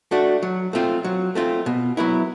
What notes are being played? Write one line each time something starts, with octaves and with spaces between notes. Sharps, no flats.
A3 D4 F#4
F#3
A3 C4 F4
F#3
A3 C4 F4
B2
F#3 B3 E4